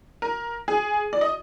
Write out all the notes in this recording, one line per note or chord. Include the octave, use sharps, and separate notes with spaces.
A#4
G#4
D5
D#5